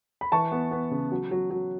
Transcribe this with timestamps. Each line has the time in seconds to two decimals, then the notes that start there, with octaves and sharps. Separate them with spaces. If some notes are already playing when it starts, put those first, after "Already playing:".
0.21 B5
0.32 E3 A5 C#6
0.52 B3
0.71 B3
0.91 C#3
1.12 F#3
1.31 F#3
1.50 F#3